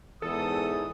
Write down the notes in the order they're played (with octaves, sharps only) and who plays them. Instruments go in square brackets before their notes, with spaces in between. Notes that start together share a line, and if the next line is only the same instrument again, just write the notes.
[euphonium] E2 [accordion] G#2 E3 [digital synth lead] A4 [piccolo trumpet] D#6